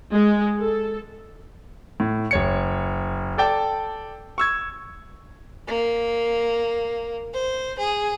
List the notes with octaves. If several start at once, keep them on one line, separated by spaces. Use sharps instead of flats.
G#3
A4
A2
F#1 C#5 C#7
A4 D5 G5 A5
C#6 E6 G#6
A#3
C5
G#4